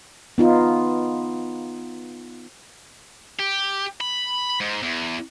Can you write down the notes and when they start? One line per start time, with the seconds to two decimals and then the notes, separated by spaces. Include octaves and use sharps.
0.38 B3 D#4 F4
3.39 G4
4.01 B5
4.60 G#2
4.82 E2